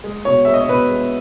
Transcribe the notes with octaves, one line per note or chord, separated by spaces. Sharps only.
G#3
B2 C#5
G#3 E5
D#5
C#5
B2 B4
G#3